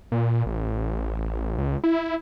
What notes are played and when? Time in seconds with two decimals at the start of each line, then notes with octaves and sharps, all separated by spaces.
0.12 A#2
0.46 A1
1.58 C#2
1.84 E4